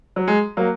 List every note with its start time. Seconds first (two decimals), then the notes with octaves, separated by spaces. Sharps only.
0.16 F#3
0.28 G#3
0.57 F#3 A#3